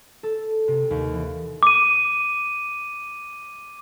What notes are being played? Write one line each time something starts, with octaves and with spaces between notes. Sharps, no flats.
A4
C3
D#2
E3
D6 D#7